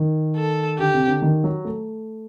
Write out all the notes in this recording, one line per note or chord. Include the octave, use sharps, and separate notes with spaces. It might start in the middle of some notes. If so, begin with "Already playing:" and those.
Already playing: D#3
A4
D3 G4
C3
D3
D#3
F#3
A3